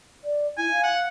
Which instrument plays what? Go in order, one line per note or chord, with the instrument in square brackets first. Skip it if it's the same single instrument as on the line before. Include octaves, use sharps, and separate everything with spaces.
[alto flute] D5
[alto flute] E4 [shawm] G#5
[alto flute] F5
[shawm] F#5